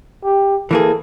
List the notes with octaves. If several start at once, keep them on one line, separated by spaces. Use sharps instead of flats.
G4
E3 A#3 G#4 A4